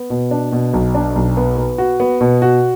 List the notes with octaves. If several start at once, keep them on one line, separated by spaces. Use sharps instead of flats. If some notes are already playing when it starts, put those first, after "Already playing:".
Already playing: B3
B2
D4
B2
B1
D4
B1
B3
B3
F#4
B3
B2
F#4